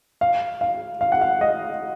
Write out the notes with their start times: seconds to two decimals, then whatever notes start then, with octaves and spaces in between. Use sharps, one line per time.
0.21 F5
0.61 F5
1.01 F5
1.12 F#5
1.21 F5
1.41 D#5